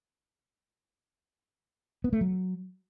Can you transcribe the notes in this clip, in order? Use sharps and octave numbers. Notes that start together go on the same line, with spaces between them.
B3
A3
F#3